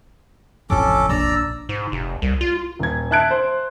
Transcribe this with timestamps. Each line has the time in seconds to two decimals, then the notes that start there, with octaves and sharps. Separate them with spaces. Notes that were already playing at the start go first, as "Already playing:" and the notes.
0.70 D1 A1 F2 C3 C#4 F4 A4 D6
1.09 A#1 D5 A#5 E6
1.69 G#2
1.92 F1
2.22 C2
2.41 F4
2.79 D#1 G#6
3.11 E5 A5 F#6 G#6 D7
3.31 C5